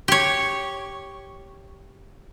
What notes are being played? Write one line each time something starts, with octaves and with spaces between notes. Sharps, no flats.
G4 C#5